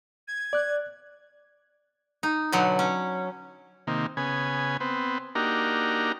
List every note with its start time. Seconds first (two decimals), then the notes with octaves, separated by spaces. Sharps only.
0.28 G#6
0.53 D5 F#6
2.23 D#4
2.52 B2 D3 F#3
2.79 C#4
3.87 C3 D#3 A#3
4.17 C#3 B3 G#5
4.80 B3 C4
5.35 A#3 D4 D#4 F#4 G4 A#4